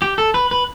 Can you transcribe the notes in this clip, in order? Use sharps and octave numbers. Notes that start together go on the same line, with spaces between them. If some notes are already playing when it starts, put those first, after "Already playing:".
G4
A4
B4
B4